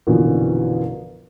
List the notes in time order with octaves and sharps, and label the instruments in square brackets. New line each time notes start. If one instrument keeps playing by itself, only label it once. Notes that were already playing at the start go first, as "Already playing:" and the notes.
[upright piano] A#1 F#2 B2 D3 E3 F3